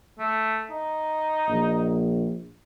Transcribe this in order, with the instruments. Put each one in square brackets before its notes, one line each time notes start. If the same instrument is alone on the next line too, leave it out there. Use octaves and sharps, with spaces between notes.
[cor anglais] A3
D#4
[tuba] A#1